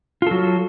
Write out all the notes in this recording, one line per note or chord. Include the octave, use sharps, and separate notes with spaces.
F#3 F4 A4